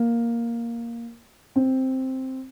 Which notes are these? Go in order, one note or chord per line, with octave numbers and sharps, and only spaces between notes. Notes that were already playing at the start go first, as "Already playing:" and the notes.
Already playing: A#3
C4